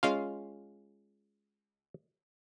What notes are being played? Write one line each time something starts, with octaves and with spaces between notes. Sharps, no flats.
G#3 C#4 F4 F5